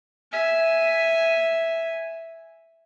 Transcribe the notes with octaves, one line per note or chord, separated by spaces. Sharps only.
E5 G#5